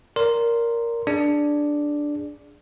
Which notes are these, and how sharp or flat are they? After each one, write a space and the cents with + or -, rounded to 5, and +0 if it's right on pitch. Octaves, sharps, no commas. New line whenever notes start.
A#4 +0 D5 -30 C6 +0
D4 +0 G#4 +0 D5 +0